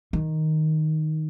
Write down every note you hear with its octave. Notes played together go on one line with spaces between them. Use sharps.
D#3